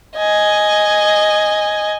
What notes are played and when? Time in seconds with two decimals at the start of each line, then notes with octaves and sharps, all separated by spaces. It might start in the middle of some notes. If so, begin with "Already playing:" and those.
0.17 D#5 G#5